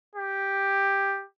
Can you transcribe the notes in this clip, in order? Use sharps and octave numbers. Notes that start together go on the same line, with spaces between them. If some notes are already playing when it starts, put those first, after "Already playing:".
G4